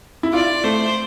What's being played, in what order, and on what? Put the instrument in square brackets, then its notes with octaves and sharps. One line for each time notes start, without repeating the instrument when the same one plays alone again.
[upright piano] E4
[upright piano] F4 [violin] D5
[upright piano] A3 [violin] C5